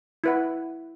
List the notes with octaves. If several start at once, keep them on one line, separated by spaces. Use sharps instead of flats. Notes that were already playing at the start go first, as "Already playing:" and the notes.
E4 B4 F#5